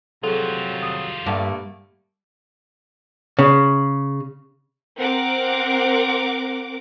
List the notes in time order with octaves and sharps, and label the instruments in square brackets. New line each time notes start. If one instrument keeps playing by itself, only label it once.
[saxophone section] C3 F#3 [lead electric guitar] G3 F4 [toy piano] G#4 A4
[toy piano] D#6
[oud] G2 [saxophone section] D3 A3 A#3 [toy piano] F#5 A5 D6
[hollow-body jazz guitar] C#3
[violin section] C4 A#4 F#5 D6